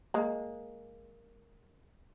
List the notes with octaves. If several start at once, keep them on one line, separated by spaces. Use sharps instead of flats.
G#3 A#3